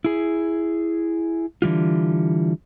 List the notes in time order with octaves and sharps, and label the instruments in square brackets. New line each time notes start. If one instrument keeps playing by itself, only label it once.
[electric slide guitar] E4 G#4
D3 E3 G3 F4